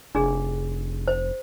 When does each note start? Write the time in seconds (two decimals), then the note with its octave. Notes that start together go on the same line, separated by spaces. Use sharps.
0.15 F1 D4 G#4
1.08 C5